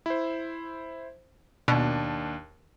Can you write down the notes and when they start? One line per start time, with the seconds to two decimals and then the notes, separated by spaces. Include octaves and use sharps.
0.06 E4 C5
1.68 D#2 B2 D4